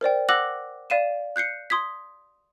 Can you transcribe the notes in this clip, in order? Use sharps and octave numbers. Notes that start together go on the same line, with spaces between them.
A#4 C5 D5 G5
F#5 D6 E6 F#6 A#6 F#7
D5 F5 D#7 E7
F#6 G6 C7 C#7
C6 D#6 G#6 B6